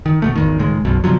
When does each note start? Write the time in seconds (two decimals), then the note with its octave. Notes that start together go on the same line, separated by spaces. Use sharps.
0.06 D#3
0.22 B2 F#3 A3
0.36 G#1 E2 D#3
0.59 C#2 A2 D#3 G#3
0.85 F#1 B1 B2
1.04 B2 D3 F3 F#3